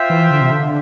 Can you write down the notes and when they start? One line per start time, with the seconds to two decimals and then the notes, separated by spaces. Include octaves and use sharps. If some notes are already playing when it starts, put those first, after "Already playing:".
Already playing: F4 C5 E5 G5
0.10 E3
0.30 D3
0.41 C3
0.51 D3